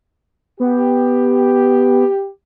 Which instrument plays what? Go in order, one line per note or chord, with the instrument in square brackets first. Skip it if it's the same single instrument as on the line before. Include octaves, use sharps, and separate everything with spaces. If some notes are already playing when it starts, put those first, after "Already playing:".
[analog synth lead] B3 [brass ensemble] G4